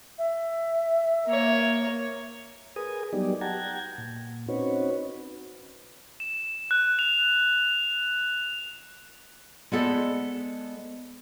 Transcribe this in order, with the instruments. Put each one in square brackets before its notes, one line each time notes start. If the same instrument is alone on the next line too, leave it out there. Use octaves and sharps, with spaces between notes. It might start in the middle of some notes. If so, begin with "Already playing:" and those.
[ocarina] E5
[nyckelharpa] A#3 C#5
[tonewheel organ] G#4 A#4 B4 G#5 D#6
F#3 G3 B3 D#4 G4 D5
F#5 G5 A5 A#5 G#6
A#2
C4 C#4 D#4 F#4 B4 C#5
[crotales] E7
F#6
F7
[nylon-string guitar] G#3 B3 A4 C5 D5 D#5